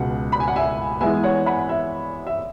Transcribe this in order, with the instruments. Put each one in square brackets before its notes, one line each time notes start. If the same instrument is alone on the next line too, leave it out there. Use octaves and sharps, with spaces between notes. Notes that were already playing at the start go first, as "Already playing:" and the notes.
Already playing: [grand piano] C#2 B2 G#3 [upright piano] F#5
[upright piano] B5
G#5
F#5
E5 G#5
[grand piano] E3 G#3 B3 [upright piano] E5 G#5
[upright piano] C#5 F#5
F#5 B5
E5
E5